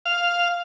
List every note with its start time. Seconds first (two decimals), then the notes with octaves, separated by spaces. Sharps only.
0.06 F5